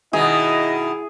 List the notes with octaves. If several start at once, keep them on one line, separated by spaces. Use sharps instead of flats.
B2 D#3 E4 G#4 D#5